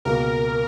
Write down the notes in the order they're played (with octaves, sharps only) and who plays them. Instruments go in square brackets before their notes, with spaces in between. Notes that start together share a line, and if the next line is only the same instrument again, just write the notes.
[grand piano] C#2 B2 A#3 [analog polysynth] A#4